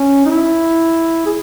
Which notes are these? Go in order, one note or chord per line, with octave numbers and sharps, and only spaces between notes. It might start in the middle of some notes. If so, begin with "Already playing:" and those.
Already playing: C#4
D#4
E4
G#4